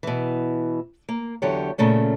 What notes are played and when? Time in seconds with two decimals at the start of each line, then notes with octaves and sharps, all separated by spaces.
0.03 B2 E3
1.09 A#3
1.42 E2 D3 F#3 G4 C#5
1.78 A#2 C#3 A3 C#4